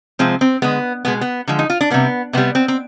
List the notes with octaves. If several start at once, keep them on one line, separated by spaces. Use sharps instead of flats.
C3 F3 G#3 C4
C4
D3 G#3 B3
B2 G#3 B3
B3
D3 F3 G#3
D#4
F4
D4
C3 G3 B3
C3 G3 B3
C4
C4